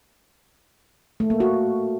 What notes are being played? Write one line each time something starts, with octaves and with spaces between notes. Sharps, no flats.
A3
A#3
F#4